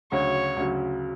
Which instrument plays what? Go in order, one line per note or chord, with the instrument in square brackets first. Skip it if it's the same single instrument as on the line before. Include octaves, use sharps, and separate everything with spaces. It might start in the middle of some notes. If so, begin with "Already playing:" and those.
[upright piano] D2 C#3 F#3 [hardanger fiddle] C#5
[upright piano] D2 C#3 F#3